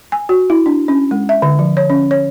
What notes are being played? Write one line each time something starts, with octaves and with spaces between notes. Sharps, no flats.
G#5
F#4
E4
D4
C#4
G#3
E5
D3
F3
C#5
C#4
C#5